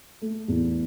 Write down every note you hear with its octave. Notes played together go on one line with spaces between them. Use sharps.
A3
E2